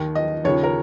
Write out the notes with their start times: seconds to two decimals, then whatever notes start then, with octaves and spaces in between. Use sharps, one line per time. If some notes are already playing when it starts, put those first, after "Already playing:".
Already playing: D#2 D#3
0.15 D#5
0.44 D#2 C#3 F3 C#5
0.63 A#4